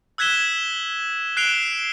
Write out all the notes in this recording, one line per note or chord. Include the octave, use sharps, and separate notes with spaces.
E6 F#6 G#6 B6 E7 G7
F#6 C7 D7 E7 F7 G7